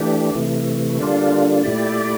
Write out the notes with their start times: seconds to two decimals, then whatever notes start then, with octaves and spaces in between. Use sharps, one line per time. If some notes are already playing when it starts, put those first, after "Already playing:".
Already playing: E3 A3 D4 G4
0.34 C3 E3 A3
0.99 D3 G3 A#3 D4 F4
1.64 A#2 A3 E4 G4 D5